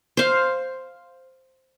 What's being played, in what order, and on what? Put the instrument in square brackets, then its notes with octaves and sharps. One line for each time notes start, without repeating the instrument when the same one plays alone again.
[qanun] C5 F5